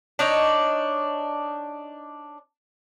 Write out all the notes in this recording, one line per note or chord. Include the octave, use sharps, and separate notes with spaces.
D4 D#4 C#5